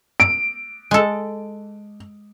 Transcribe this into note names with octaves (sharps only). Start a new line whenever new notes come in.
D7
G#3 A4